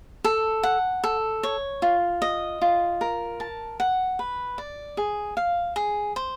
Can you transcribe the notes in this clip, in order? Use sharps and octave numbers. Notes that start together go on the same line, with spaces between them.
A4
F#5
A4
C#5
F4
D#5
F4
A#4
A5
F#5
B4
D5
G#4
F5
G#4
C5